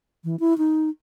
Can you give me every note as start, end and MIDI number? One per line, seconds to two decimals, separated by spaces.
0.24 0.36 52
0.40 0.57 64
0.58 0.89 63